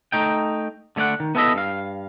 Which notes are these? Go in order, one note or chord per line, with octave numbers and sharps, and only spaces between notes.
A3 D#4 G5
D3 A3 C#5 D5 F#5
D#3
B3 E4 A4 C5 D#5 E5
G2 F5